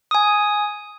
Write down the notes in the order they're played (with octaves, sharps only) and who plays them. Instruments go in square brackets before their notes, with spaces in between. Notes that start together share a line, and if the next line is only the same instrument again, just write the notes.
[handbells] G#5 D#6